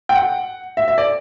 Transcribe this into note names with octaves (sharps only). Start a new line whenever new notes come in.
G5
F#5
E5
E5
D5